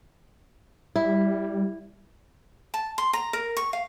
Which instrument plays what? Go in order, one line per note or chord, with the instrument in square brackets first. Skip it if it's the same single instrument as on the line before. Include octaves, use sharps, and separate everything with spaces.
[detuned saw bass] G3 [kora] E4
[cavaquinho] A5
C6
A#5
A#4
C#6
F5